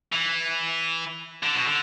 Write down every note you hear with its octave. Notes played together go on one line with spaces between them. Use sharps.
E3
D3
B2
D3